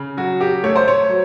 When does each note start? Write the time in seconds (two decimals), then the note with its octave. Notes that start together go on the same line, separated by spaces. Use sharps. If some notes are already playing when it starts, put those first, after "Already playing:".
Already playing: C#3
0.17 F#3 F#4
0.41 G4
0.64 A3 C#5
0.76 C5
0.88 C#5
1.10 F#3